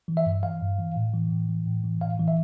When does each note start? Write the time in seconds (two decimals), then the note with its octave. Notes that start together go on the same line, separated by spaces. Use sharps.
0.08 E3
0.17 E5
0.26 G2
0.43 E3 F5
0.61 G2
0.79 E3
0.96 A2
1.14 E3
1.31 A2
1.49 E3
1.66 A2
1.84 E3
2.01 A2 F5
2.19 E3
2.28 E5